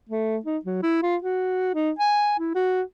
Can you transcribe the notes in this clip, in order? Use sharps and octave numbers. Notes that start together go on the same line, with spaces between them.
A3
D#4
F#3
E4
F4
F#4
D#4
G#5
E4
F#4